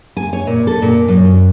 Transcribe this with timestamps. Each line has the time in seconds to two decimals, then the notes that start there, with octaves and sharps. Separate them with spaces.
0.17 G#5
0.33 C#5
0.47 A#2
0.67 A4
0.82 A#2
1.08 F#2